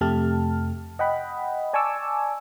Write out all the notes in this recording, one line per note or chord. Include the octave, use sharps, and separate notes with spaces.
F2 C3 A3 G4 A5 F6
D#5 F#5 G5 B5
D5 G#5 A5 C#6 D6 E6